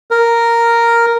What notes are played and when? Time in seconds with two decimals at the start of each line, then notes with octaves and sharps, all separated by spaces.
0.11 A#4